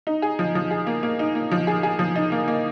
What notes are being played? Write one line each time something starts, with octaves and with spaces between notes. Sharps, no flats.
D#4
G#4
F3
F3
G#4
A#3
A#3
D#4
A#3
F3
G#4
G#4
F3
D#4
A#3
A#3